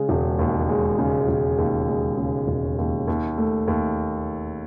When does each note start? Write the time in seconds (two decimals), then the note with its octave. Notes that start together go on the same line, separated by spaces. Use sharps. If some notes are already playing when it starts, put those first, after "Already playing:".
Already playing: C#3 G#3
0.09 E1
0.39 D#2
0.69 G#3
0.99 C#3
1.28 E1
1.58 D#2
1.89 G#3
2.18 C#3
2.48 E1
2.78 D#2
3.08 D#2
3.38 A3
3.68 D#2